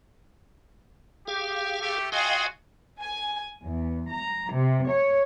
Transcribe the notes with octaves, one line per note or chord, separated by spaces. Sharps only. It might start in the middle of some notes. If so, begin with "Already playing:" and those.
G4 G#4 F5
A3 G4
F4 F#4 G#4 D#5 F5 G5
G#5
E2
A#5
C3
C#5